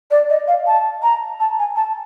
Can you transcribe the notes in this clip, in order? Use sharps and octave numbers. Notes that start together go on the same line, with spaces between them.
D5
D#5
F5
A5
A#5
A5
G#5
A5